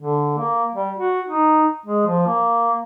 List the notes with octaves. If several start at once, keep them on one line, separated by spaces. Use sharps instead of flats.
D3
A#3
G3
F#4
D#4
G#3
F3
A#3